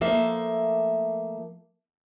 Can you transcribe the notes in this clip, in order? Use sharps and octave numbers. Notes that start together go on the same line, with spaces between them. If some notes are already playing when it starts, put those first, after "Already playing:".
F3 A3 A#3 E5